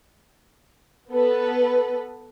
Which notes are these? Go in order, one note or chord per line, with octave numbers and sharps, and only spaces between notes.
B3 A4 B4